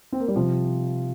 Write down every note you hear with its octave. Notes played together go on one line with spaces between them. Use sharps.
C4
A#3
G3
C3 F3